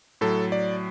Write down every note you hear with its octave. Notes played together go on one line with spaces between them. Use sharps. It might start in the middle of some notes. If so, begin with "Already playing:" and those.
A2 F#3 A4
D5